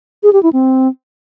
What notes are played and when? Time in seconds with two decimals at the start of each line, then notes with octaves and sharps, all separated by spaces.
0.23 G#4
0.33 G4
0.43 E4
0.53 C4